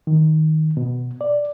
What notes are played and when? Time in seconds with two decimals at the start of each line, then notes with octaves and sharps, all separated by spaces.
0.07 D#3
0.77 B2
1.21 D5